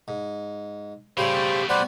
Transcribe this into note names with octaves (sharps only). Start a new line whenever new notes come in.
G#2
A2 C#3 G3 G4 C5
B2 A3
G3 B3 C5 D5 F#5 B5